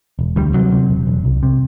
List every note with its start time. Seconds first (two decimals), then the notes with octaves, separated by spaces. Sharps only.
0.19 E1
0.36 D2 G3
0.54 C3 F#3
0.72 C3
0.90 E1
1.07 E1
1.25 C2
1.43 C3